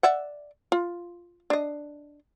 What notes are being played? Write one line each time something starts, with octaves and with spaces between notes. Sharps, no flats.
D5 E5 F#5
F4
D4 D#5